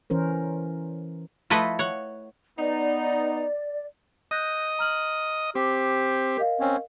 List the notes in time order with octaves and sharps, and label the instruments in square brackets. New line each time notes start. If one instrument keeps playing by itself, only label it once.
[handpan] E3 C#4 A#4 C5
[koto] F3 A3 E4 A4 B4 D#5
C#5 F#5
[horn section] B3 D#4 [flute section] D5
[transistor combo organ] D#5 D#6 [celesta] F#6 G6 A#6
[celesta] A#5 F6 F#7
[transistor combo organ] C4 [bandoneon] G4 [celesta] D6
[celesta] A#4 D#5 F5
[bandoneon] C4 C#4